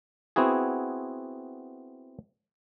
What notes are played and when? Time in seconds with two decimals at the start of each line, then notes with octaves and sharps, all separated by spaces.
0.36 B3 C4 E4 F#4 G#4